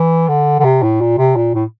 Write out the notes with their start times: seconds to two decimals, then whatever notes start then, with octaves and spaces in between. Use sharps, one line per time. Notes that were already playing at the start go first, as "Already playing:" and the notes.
Already playing: E3
0.28 D3
0.60 D3
0.64 C3
0.83 A2
1.01 A#2
1.18 C3
1.36 A#2
1.55 A2